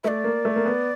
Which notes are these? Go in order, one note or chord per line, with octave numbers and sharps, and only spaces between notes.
A3 D5 E5
A#3
A3
A#3
B3